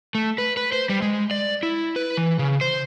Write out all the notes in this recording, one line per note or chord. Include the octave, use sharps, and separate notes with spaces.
A3
B4
B4
C5
G3
G#3
D5
E4
B4
E3
C#3
C5